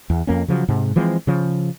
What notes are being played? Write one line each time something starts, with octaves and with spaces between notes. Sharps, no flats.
E2
F2 A#3 C#4
C#3 F3 F#3
G#2 C3
E3 F3 G#3 C4
C#3 F3